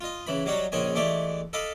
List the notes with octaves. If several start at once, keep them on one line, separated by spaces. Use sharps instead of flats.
F4 D#5
C#3 E3 B5
F#3 G3 D#4 F#4 C#5
A#1 C#3 C4 C#4 D#5 G#5
E3 G#3 A3 G4 D5 D6
A4 D#5 F5 B5 D6